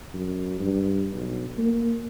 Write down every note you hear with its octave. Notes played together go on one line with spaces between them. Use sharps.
F#2
G2
B1
A#3